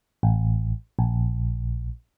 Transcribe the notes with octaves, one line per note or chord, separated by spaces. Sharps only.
A1
A#1